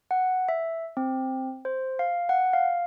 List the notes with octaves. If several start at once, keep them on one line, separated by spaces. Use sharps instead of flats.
F#5
E5
C4
C5
F5
F#5
F5